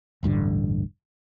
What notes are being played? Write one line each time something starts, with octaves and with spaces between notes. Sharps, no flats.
E1 A1 G2 D3